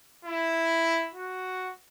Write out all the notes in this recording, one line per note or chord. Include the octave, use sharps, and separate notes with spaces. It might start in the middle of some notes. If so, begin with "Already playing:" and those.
E4
F#4